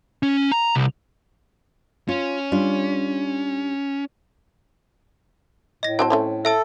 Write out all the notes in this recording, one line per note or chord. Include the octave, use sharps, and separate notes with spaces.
C#4
A#5
C2
C#4 F4
G3 D4 F4
A2 D#5 A#6
F#3 C4 C5 A5
A3 C4 C#4
A4 E5 A5 E6